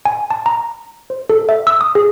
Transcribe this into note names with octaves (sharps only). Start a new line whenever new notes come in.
G#5
A5
A#5
C5
A4
E5
E6
D#6
G#4